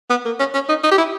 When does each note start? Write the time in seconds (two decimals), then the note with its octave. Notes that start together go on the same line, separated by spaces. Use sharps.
0.10 B3
0.25 A#3
0.39 C#4
0.54 C#4
0.69 D#4
0.83 D#4
0.91 G4
0.98 E4